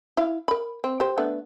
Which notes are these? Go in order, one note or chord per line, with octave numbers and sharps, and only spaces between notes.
E4 F5
A#4 B5
C4
G4 C5
A3 B3 D4